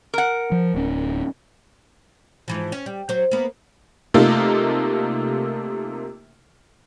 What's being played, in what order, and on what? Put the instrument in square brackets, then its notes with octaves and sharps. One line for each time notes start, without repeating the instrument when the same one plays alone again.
[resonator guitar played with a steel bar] A#4 F#5
[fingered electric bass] F3
D1 C#4
[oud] G#2 E3 F3
C#4
G3
F#3 C5
A#3 B3
[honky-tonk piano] C3 A3 A#3 D#4 F4 A4